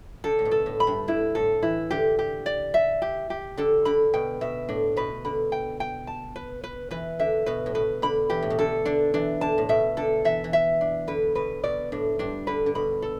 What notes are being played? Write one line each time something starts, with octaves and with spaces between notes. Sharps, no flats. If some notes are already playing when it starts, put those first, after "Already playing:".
D3 A4
A2
B2
A4
A2
B5
G2
D3 E4
A2 A4
E3 E4
D3 G4
G4
D5
E5
G4
G4
D3 A4
D3 B5
B2 G5
B2 E5
A2 D4
B2 B4
D3 B5
G5
G5
A5
B4
B4
E3 B4
D3 E5
B2 B4
A2
B2 B4
D3 B5
E3 G4
A2
B2
D3 A4
D3 D4
E3 D4
D3 A5
A2
B2 E5
D3 A4
E3 E5
E3
E5
D4
D3 B4
B2 B4
B2 D5
A2 D4
G2 D4
D3 B4
D3
B2 B5
A4